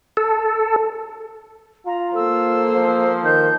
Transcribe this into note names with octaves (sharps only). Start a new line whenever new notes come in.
A4
F4 A#5
A#3 A4 C5 E6
F3
D#3 G6